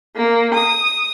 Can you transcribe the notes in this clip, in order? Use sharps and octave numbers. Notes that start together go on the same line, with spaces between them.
A#3
D#6